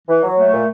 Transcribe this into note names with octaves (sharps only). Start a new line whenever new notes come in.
E3
F#3
A3
A#2